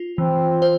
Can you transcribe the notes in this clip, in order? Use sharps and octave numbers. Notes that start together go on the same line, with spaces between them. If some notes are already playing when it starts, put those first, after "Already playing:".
Already playing: F4
E3 C4
C5